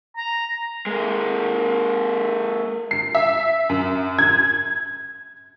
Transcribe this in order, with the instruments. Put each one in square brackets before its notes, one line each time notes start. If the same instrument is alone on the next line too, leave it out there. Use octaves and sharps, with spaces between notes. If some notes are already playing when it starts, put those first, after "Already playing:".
[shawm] A#5
[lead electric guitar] G#3 A#3
[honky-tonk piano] C7
E5
F#2
G#6